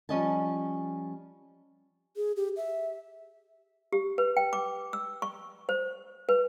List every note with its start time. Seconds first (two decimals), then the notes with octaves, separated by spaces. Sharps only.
0.09 F3 G3 C#4 D#5 G#5 A5
2.16 G#4
2.36 G4
2.57 E5
3.93 G4
4.18 B4
4.37 G5
4.53 D6
4.93 E6
5.22 C#6
5.69 C5
6.29 B4